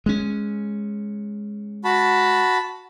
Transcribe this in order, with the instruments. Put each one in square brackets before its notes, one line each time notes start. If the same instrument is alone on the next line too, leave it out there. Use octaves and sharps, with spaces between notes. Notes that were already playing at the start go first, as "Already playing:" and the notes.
[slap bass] G#3 C#4
[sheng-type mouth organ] F#4 A5 B5